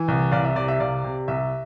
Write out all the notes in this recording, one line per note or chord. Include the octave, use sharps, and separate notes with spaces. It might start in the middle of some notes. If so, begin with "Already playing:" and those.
Already playing: E3
C2
C2 D5 F5
E5
C3 D5
E5
C2 D5 F5
C3
C2 E5